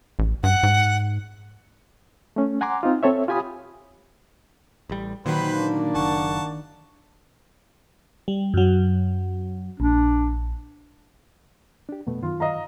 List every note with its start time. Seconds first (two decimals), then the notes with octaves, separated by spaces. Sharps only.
0.19 A1
0.44 G2 F#5
0.63 G#2
2.36 A3 C#4
2.61 F#5 G#5 A#5 C6 D6
2.83 C4 D#4 F4
3.03 C4 A4 C#5 E5
3.28 F4 G4 G#5 B5 D#6
4.90 A1 G3
5.26 A#2 D#3 F#3 B4 C5 G5 B5
5.57 A#3 D4
5.95 F#1 F#5 A5 C#6
8.28 G3
8.54 F#2 F#3
9.80 A#1 D4
11.89 D4 G4
12.07 F2 B2 A3 B3
12.23 F#2 D#3 F4
12.40 D#5 F5 A#5